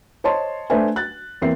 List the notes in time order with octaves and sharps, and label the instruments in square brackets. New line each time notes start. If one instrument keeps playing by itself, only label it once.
[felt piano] C5 C#5 D#5 A5 C6
A3 D4 B4 C5 E5 G#5
F#6 A6
E2 A#3 C4 E5 C7